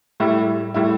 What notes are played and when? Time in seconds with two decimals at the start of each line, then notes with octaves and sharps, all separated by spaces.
0.20 A2 G3 E4
0.74 A2 G3 E4